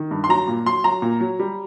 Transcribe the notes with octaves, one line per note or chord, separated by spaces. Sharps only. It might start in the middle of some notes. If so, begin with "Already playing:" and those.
Already playing: D#3
G2
C6
F#3 A#5
A#2
F#3 C6
F#3 A#5
A#2
F#3
G3